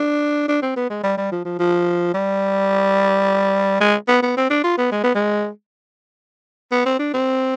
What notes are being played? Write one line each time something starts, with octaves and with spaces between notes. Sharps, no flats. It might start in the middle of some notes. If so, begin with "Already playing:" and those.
Already playing: D4
D4
C4
B3
G#3
G3
G3
F3
F3
F3
G3
G#3
B3
B3
C4
D4
F4
B3
G#3
B3
G#3
B3
C4
D4
C4